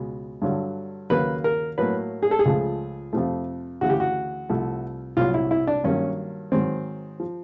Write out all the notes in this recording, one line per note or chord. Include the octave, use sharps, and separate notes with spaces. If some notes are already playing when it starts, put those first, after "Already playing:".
Already playing: C#2 B2 G#3
G2 D3 F#3
D#2 C#3 F#3 A#3 B4
A#4
A2 F#3 A#3 B4
G#4
A4
G#4
C#2 C#3 F3 A3
F2 C3 F3 A3
D2 C#3 E3 F#4
G4
F#4
C2 C3 F3 A3
C2 A#2 F#3 F4
E4
E4
D4
G2 D#3 F#3 A#3 C#4
G#2 D#3 F#3 C4
F3